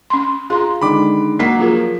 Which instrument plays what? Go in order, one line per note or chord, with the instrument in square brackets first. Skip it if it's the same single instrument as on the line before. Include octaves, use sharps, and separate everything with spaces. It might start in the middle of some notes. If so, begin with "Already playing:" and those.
[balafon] C#4 C6
[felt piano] F4 A#5 [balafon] G#4 C6
[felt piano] D3 D#3 G#3 [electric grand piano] B5 D6
[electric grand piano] F#3 A#3 [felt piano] F#5 B6 C7
[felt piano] F3 [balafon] F4 G#4 A#4